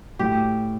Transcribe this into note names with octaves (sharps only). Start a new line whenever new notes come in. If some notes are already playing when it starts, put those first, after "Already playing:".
A2 G4